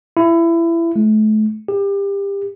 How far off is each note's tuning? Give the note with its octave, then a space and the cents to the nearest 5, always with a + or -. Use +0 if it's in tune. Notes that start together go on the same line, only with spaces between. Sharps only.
E4 +25
A3 -35
G4 +25